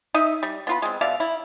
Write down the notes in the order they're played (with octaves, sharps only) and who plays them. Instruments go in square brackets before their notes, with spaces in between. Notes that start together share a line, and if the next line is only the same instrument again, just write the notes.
[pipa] D#4 D#5 E5
G3
B3 F4 B5
G#3 C4
B2 D5 E5 F5
E4